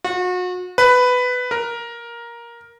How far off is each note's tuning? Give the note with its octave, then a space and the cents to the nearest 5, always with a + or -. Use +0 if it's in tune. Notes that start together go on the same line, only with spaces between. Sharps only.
F#4 -35
B4 +10
A#4 +10